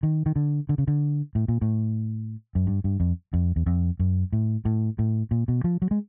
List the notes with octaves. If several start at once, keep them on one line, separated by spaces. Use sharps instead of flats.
D#3
D#3
D3
D3
C#3
D3
A2
A#2
A2
F#2
G2
G2
F2
F2
E2
F2
F#2
A2
A2
A2
A#2
B2
F3
F#3
G#3